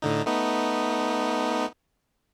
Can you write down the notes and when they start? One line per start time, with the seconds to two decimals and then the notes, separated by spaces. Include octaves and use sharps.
0.02 A2 D3 D#4
0.26 A3 B3 D#4